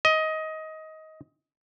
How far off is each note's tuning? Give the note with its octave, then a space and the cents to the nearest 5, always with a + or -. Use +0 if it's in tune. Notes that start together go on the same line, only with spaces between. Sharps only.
D#5 +20